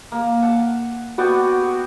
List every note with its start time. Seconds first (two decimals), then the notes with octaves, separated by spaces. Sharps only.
0.12 A#3
0.42 F#5 A5
1.18 B3 F#4 D5 G5
1.62 F#4